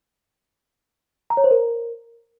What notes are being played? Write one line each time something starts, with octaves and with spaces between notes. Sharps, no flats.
A#5
C#5
C5
A#4